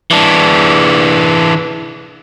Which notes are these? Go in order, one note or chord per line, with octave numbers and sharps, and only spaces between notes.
E3 D4